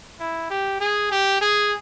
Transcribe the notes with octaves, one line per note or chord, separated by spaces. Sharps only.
E4
G4
G#4
G4
G#4